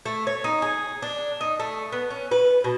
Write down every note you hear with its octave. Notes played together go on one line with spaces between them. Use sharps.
A3
C#5
D#4
G#4
D4
D#4
A3
B3
C#4
B4
B2